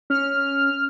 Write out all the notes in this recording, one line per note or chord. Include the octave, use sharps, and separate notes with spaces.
C#4 F6